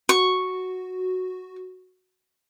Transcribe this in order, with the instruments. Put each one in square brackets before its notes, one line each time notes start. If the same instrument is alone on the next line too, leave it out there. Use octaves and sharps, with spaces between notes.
[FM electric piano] F#4 [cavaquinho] C#6